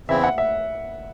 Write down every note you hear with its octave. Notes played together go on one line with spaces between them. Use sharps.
E2 C#3 E3 C4 E4 E5
F#5
E5